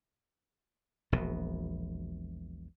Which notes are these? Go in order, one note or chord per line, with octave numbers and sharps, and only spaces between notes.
E1 A#1 B2